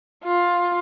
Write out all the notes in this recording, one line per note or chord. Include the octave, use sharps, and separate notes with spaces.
F4